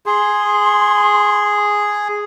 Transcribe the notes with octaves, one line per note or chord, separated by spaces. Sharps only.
G#4 C6